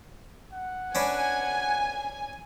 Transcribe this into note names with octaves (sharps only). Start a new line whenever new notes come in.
F#5
C#4 D4 B4 G#5